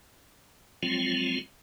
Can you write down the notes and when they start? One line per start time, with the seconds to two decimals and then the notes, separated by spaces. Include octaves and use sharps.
0.83 F3 F#3 G#3 C4 F4